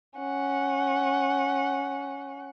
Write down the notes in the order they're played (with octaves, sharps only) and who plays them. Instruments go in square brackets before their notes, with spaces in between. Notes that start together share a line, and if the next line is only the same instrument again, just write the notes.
[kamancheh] C#4 F#5